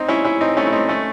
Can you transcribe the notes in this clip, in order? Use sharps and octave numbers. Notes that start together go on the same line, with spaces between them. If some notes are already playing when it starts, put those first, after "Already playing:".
Already playing: C4 D#4
C#4 E4
C#4 E4
C4 D#4
A3 C#4
E4
C4 D#4
A3 C#4